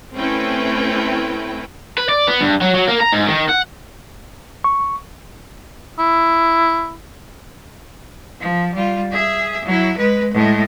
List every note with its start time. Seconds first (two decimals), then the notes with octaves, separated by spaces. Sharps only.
0.15 A3 C4 C#4 E4 B4 G5
1.98 B4
2.09 D5
2.28 B3
2.41 G2
2.62 F#3
2.76 F#3
2.88 A#3
3.01 A#5
3.13 G#2
3.28 D#3
3.49 F#5
4.64 C#6
5.99 E4
8.41 F3
8.74 G3 F4
9.11 G#4 E5
9.65 F#3 E4
9.97 G#3 B4
10.34 A2 G#3